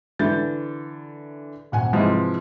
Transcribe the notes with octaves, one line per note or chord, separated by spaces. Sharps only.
D3 E3 G6 A6
D#1 F#5 G#5
G#2 C3 E3 F3 G#3